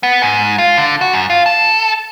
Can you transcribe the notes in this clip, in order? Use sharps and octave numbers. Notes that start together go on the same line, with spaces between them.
B3
G#2
F4
D3
F#4
F#2
F4
A4